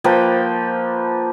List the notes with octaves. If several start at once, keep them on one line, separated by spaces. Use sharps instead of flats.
F3 A#3 B4 G5